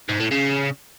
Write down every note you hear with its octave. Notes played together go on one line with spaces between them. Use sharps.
G#2
A2
C#3